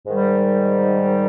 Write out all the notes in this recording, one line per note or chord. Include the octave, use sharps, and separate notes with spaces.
G#2 D#3 G3